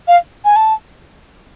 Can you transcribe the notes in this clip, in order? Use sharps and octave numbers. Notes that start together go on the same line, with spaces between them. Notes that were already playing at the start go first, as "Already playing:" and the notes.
F5
G#5
A5